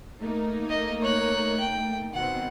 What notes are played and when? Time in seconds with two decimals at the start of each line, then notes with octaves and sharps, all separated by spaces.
0.21 A3 A#3 D#4
0.69 D#5
1.02 C#5 F#6
1.60 G5
2.14 B2 D#3 C4 F#5